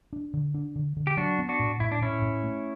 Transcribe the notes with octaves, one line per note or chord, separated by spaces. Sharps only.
D4
D3
D4
D3
D3
G4
F#3 D4 F#4
B3
D4 F#4
A2
A2 E4
D4
A2 C#4 E4
A2
A3